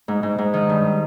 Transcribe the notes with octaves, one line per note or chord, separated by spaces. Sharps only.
G#2
G#2
G#2
D#3
G2